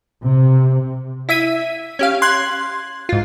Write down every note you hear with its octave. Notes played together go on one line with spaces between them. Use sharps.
C3
E4 E5 B6 D#7
C#4 G4 F5
C6 F#6 G#6
G#2 F4